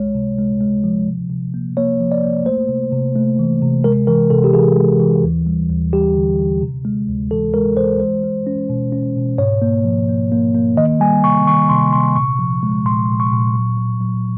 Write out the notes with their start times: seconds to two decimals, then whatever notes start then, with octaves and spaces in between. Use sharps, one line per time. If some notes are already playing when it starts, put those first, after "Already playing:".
Already playing: C#2 G#3 C#5
0.15 C3
0.39 G#3
0.61 G#3
0.84 F3
1.08 C3
1.30 C3
1.54 A#3
1.77 A#3 C#5
2.01 F3
2.12 D5
2.23 A#3
2.46 A3 C5
2.69 C3
2.92 C3
3.16 A3
3.39 E3
3.62 C3
3.84 G#3 A#4
4.07 E3 A#4
4.30 C3 A4
4.44 G4
4.54 E3 G#4
4.77 G#3
5.00 E3
5.23 D#2
5.46 G3
5.69 D#2
5.93 G3 G4
6.15 D3
6.39 D3
6.61 C3
6.85 G#3
7.09 D2
7.31 E3 A4
7.54 G#3 A#4
7.77 E3 C5
8.00 G#3 C5
8.23 G#3
8.47 C#4
8.69 B2
8.92 C#4
9.16 B2
9.38 G#2 C#5
9.62 A#3
9.85 F3
10.09 A#3
10.32 A#3
10.55 A#3
10.77 D#3 D#5
11.00 G3 G#5
11.24 C3 C#6
11.47 D#3 C#6
11.69 C3 C6
11.93 C3 C6
12.16 A#2 C#6
12.39 F3
12.63 G#3
12.85 A#2 C6
13.09 A#2
13.20 C#6
13.32 A#2
13.55 F#3
13.78 F#3
14.00 F#3